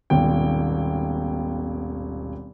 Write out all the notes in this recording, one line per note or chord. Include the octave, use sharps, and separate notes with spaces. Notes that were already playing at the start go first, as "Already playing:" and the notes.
D#1 G#1 B2 G5